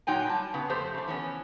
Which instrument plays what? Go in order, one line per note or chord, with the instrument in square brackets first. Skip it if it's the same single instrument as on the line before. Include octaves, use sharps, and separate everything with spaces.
[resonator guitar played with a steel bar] A#2 F#3 D#4 G5 G#5
G3 A5
C#3 B3
F2 A3 G4 C5
C#3 A3
E3 B3 C#4